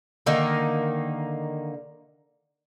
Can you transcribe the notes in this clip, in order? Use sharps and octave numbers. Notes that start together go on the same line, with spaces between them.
D3 D#3 A#3 D#4